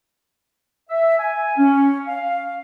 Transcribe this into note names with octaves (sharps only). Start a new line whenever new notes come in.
E5
G#5
C#4
F5